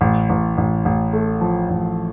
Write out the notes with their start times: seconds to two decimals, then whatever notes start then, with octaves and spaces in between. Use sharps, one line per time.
0.01 A1
0.29 A1
0.58 A1
0.85 A1
1.13 A3
1.41 F3
1.70 A1